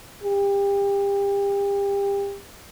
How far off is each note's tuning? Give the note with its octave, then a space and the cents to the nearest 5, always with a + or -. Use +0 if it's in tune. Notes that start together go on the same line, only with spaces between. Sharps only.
G4 +30